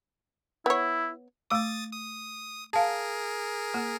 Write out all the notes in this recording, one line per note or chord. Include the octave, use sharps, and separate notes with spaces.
B3 E4 C#5
A3 D6 D#6 A6
D#6
G#4 A#4 F5 A5
A#3